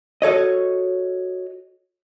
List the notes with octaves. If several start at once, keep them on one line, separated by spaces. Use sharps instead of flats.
F#4 A4 C#5 D#5